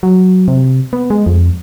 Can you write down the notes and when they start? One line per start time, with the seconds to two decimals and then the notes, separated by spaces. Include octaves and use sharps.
0.03 F#3
0.48 C3
0.93 B3
1.10 G#3
1.26 F2